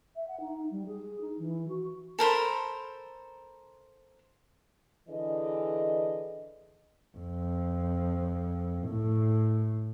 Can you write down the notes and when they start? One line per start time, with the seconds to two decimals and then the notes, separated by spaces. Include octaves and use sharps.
0.15 E5
0.27 F#5
0.40 D#4
0.70 G3
0.86 G#4
1.21 D#4
1.38 E3
1.68 F#4
2.19 A4 A#4 C5 B5
5.09 D3 E3 G#4 D#5
7.17 F2
8.88 A2